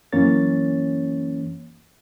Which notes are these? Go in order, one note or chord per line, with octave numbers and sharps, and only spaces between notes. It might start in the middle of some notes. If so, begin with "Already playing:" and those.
F#2 E3 A#3 C#4 C#5 A6